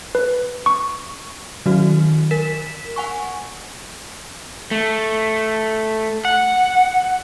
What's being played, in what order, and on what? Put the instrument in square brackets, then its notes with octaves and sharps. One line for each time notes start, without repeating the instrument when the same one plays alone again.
[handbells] B4
C#6
[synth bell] D#3 F#3 F#4
A#4 B6 E7
F#5 G#5 C#6
[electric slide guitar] A3
F#5